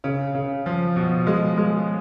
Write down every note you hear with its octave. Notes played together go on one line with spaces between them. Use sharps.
C#3
C#3
F3
B2
G#3
G#3